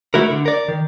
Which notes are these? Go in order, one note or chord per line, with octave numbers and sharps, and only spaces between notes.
A3 E4 F#4 A#4
D3
A#4 D5
D#3